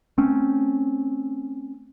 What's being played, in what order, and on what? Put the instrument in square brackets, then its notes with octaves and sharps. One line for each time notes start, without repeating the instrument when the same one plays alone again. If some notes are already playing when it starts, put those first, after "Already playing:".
[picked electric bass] A3 C4 C#4